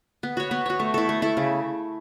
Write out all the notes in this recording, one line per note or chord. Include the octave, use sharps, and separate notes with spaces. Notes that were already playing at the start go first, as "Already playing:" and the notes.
B3
F#4 C#5
B3
F#4 C#5
A3
E4 A4
A3
E4 A4
C#3